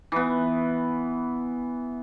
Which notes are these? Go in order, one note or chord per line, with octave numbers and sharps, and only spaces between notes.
E3 B3